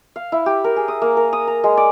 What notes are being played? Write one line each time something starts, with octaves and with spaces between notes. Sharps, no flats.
F5
E4
G4
A#4
G#4
D#6
A#3
A#4
D#6
A#5
G#3
D5